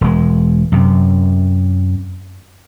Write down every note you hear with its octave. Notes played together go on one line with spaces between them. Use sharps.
E1 G#3
F#2 C3